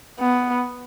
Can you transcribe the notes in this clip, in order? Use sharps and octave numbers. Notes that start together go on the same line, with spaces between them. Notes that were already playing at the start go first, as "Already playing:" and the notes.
B3